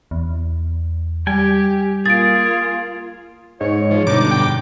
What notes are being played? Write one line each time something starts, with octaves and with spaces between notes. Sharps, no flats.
E2
G3 G4 G5 G#5
A#3 F4 G#4 A6 D7
G#2 C#5
F3
G2 B2 D3 D#4 D6
G5